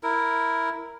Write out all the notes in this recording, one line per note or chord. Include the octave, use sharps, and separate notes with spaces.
E4 A#4